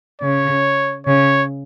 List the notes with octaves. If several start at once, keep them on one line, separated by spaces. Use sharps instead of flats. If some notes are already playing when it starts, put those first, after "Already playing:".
C#3 C#5
C#3 C#5